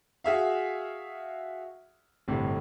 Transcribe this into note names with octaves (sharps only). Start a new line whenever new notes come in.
F#4 G#4 E5 F5
G1 A2 C3